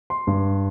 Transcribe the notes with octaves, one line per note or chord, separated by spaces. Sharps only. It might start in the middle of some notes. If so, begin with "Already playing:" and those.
C6
G2